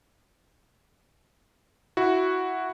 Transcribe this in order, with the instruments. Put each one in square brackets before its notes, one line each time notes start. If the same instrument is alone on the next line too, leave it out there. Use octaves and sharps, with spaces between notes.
[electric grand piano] E4 F#4